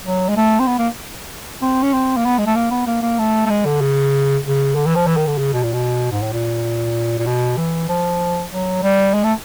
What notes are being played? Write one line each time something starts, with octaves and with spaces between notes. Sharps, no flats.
F#3
G#3
A3
C4
B3
A#3
C4
C#4
C4
A#3
B3
G#3
A3
A#3
B3
A#3
A#3
A3
A3
G#3
D3
C#3
C#3
D3
E3
F3
E3
D#3
D3
C#3
B2
A#2
B2
G#2
A2
A#2
A#2
B2
E3
F3
F#3
G3
G#3
A3